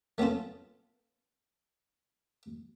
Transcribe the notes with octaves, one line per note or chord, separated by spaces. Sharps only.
A3 B3 C#4 F4 A4